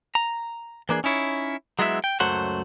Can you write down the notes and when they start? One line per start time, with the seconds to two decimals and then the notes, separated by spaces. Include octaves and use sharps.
0.15 A#5
0.89 E3 A#3 D4 G#4
1.04 C#4 D#4 E4 C#5
1.79 F#3 G#3 B3 E4 A4 E5
2.04 G5
2.20 C#2 F#2 F#3 A3 C5 F#5